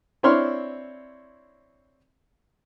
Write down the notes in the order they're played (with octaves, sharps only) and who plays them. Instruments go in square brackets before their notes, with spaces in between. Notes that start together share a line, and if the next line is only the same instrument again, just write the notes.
[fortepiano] C4 D4 E4 C#5 C6 F6